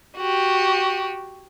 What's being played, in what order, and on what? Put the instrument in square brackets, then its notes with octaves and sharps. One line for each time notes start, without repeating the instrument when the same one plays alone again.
[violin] F#4 G4